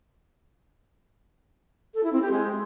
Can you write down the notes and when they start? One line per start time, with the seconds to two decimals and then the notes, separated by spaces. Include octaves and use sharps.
1.94 A4
2.03 E4
2.13 C4
2.22 G4
2.31 G#3